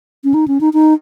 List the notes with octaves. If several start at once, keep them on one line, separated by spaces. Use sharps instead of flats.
C#4
D#4
C#4
D#4
D#4